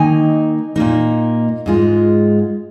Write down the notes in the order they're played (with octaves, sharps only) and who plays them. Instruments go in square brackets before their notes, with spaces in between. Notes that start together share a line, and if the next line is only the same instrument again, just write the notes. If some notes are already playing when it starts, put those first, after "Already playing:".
Already playing: [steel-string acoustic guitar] D#3 A#3 D#4 G#5
A#2 A#3 D#4
G#2 G#3 F4